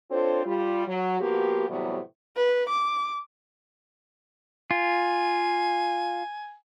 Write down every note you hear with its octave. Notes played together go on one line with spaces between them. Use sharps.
C4 D4 F4 A4 C5 C#5
G3 F4
F#3
F3 A#3 B3 F#4 G4
A2 C3 E3 F#3 G3 B3
B4
D6
F4 G#5